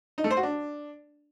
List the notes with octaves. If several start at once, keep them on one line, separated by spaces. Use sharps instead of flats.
D#4
A3
C5
F#4
D4